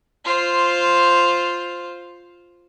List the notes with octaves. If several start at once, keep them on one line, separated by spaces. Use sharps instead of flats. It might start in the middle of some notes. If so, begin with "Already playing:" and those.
F4 C5